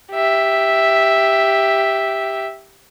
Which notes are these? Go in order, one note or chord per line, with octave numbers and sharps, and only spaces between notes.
G4 E5